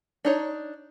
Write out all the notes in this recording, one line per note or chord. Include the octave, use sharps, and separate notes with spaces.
D4 D#4 C#5